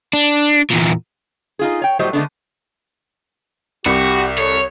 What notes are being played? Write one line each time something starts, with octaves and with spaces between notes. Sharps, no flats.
D4
E2 A#2
D#4 F4 G#4
C#5 G5
A2 F#3 G3 C5 D#5
D3 E3 G#3 A3 B3 D4
C2 F#4 G4
A4 C#5